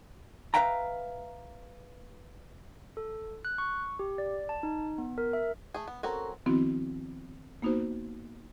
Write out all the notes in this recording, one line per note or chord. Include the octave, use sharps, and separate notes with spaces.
B4 C5 E5 F5 G5 A#5
A4
F#6
C#6
G4
D5
A5
D#4
B3
A#4
E5
A3 G#4
B3
C4 C#4 F#4 A4 A#4 A#5
D#3 F3 B3 C4 E4 F#4
A#3 B3 D#4 F#4 C5